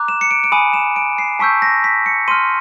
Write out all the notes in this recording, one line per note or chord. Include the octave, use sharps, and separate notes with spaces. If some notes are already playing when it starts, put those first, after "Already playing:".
Already playing: A#5 D6 F#6
E7
C#7
D7
D7
G#5 B5 D#6 D#7
E7
D7
C7
A5 C#6 E6 G6 B6
A#6
B6
C#7
C6 F6 D#7